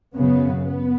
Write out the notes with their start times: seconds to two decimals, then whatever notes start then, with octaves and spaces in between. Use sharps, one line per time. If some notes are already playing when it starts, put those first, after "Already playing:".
0.14 F#2 C#3 B3
0.64 B3